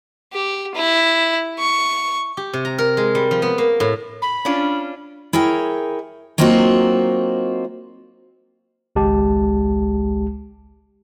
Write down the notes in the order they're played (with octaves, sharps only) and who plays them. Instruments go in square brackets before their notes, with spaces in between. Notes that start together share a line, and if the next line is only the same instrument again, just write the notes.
[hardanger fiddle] G4
E4
C#6
[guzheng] G4
C3
A#5
A#4
G#3
G3
F3
B3
A#3
A2
[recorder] B5
[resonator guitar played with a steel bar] C#4 D4 F4
[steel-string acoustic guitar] E4 G#4 A#4 C#5 G5
F#3 A#3 C4 D#4 F4 F#4
[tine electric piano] G#1 C#2 G#3 G4 A5